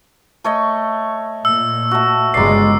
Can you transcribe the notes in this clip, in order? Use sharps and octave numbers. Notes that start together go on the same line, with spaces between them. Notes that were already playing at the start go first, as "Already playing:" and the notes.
A3 C#5 D#5
A#2 E6
A3 F#4
G1 C#3 G#3 D5 A#5 C7